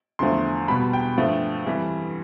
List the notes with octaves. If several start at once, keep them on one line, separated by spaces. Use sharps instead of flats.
E2 D3 F3 A3 C6
B2 G3 B5
G5
G2 F3 A3
F2 E3 G3